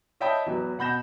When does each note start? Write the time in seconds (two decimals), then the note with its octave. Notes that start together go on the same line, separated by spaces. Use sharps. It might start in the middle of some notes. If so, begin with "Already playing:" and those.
0.20 C#5 D#5 E5 G5 A5 B5
0.46 E2 F#3 B4
0.78 B2 F#5 B5 G6 A#6 E7